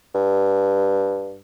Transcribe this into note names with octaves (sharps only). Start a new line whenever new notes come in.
G2